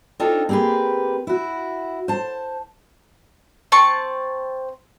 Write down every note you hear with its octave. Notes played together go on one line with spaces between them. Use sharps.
C4 D4 D#4 F4 A4
A#3 C4 G4 G#4 B4
E4 F#4
C5 A5
C4 A5 C#6